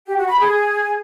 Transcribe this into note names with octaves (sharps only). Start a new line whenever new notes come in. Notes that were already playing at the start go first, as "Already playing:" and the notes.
G4
F#4
B5
G#4